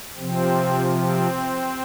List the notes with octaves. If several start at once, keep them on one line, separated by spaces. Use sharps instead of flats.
C3 F3 C4
C4